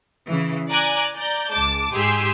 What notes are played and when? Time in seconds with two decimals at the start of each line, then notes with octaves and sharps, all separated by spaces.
0.28 C#3 E3
0.69 D5 G#5 A#5 D6 F#6
1.15 D5 A#5 G6
1.51 C#2 G#3 A5 D6
1.92 G#2 G4 G#4 G#5 C6 E6